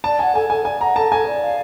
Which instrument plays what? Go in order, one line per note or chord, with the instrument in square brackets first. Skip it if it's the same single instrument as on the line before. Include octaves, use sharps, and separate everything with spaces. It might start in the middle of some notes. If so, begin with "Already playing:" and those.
[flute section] D5 [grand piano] A5
[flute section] F#5 [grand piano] G#5
[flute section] A4 [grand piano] G#5
[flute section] A4 [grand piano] G#5
[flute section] D5 [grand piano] G#5
[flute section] F#5 [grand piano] A#5
[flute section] A4 [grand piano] A5
[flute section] A4 [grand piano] G#5
[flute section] D5
F5